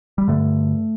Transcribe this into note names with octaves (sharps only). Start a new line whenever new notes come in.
G3
G2 D3 A3